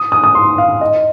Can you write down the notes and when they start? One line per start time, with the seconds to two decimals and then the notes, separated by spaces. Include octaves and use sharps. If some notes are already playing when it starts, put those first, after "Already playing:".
Already playing: D#6
0.12 D#6
0.24 D#6
0.35 C6
0.58 F5
0.81 D#5